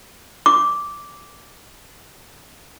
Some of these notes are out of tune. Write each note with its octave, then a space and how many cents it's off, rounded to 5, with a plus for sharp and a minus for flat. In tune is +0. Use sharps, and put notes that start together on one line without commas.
D6 -10